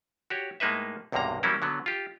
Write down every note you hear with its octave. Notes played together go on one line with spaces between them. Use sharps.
F#4 G4 C#5
A2 G#3 A#3 D#4 B4 E5
B1 E2 G2 C3 A#3 A#5
E3 F#3 G3 A#3 C#4 E4
D3 F#3 B3
F4 G4